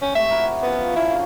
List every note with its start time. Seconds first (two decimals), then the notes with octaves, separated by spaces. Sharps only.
0.02 C#4 G5
0.15 C3 G#3 A3 E5
0.30 E4 F#4 A#4
0.62 C#3 F3 B3
0.96 F3 C#4 E4 F4
1.11 D3 F#3